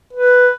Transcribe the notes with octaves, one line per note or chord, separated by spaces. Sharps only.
B4